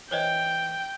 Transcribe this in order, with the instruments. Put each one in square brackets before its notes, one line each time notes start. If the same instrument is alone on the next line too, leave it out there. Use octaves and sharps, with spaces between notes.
[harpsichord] E3 [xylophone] C5 C#5 D#5 [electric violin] G5